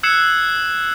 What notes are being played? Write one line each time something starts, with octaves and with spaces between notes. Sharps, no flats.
E6 F#6 G#6 C7 C#7 E7